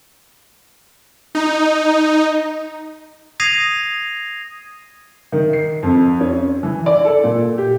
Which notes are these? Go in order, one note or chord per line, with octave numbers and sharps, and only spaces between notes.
D#4
D#6 G#6 A#6 C7 D#7 F7
D#3
C7
F2
C#4
E3
D5
A4
A#2
G4